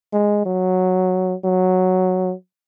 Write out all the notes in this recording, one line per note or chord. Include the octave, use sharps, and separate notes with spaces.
G#3
F#3
F#3